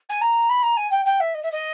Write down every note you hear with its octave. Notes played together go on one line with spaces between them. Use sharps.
G#5
A#5
B5
A#5
G#5
G5
G5
E5
D#5
E5
D#5